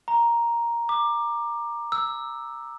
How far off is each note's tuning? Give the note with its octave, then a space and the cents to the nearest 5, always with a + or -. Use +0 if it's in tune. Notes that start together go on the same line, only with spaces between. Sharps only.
A#5 +5
D6 +20
E6 +0